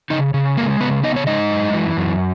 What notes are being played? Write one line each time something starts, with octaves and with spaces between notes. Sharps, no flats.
C#3 D#4 D#5
C#3
G#3 A#3 A#4
C#3 B3 B4
B3 D#4 D#5
C#5
G#3 D#4 D#5
F#2
E3
F#2